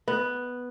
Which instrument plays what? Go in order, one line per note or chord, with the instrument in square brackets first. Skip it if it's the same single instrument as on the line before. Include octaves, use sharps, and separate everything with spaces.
[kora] B3